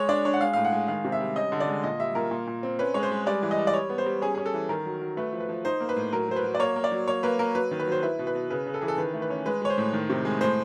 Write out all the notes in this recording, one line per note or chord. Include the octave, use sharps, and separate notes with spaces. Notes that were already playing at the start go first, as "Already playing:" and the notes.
Already playing: G#3 C#5
D4 D5
D4 C#5
F#5
G#3 F5
A2 F5
F#5
G#3
D#3 F5
C3
E5
G3
C#4 D#5
D3
D5
G#3
A#2 D#5
G3 E5
A#2 A#4
A#2
A#2
C4
C#4 B4
G#3 C#5
C5
G#3
G3 D5
E3
D#5
G3
D5
G3 C#5
B3
C5
G3
C#4 G#4
C#4 G#4
A4
E3
D#3 A#4
F#3
F#3
A3 B4
F3
B4
F3
D#4 C5
A#3
B4
A2
F#3 A#4
F#3 C5
B4
F#3
D5
A#3 C#5
A#3
D5
F#3
A#3 C#5
A#3 B4
A#3 A#4
F#3 B4
D#3
B4
F#3 C5
E4 B4
B2
B4
B2
C#3 B4
C#3
A4
E3 G#4
A4
D#3 B4
A3
B4
C#4
G#3 B4
G#3 C#5
C5
A2
D#3
C3
G#3
A2 C5